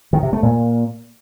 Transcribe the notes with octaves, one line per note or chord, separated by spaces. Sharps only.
D#3
C3
A3
A#2